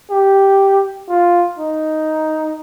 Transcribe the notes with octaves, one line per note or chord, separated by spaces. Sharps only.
G4
F4
D#4